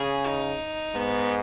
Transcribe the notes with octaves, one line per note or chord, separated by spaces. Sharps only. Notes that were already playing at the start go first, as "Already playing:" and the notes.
Already playing: C#3 G#4
D#4
G#2 B3